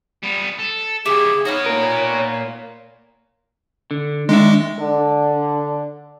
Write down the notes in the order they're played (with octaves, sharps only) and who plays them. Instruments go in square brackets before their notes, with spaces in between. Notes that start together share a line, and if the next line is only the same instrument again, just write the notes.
[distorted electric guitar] G3 B3
A4
[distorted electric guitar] C#3 E5 [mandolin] G4 [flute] G#4
[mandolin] D#4 F5 F#6 [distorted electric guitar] F#4 B4 [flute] C#5
[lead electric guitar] A#2 A#4
[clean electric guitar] D3
[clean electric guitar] D#3 D4 E5 [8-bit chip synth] G#3
[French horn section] D3 D4